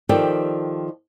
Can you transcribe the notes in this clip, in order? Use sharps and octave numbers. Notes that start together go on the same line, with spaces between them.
D#3 F3 G4 A4 D5 G5